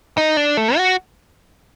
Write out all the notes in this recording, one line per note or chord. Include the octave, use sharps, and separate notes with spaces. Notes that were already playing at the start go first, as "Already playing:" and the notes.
D#4
D4
A3
F#4